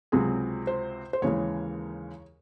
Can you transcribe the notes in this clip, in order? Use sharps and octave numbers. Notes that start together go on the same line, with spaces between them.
C#2 C3 F#3 C4 G#4
C5
C5
D#2 C#3 E3 G#3 C#5